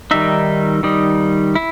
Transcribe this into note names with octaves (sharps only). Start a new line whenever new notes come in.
D#3 G3 D#4 E5
D#3 G3 D#4
E4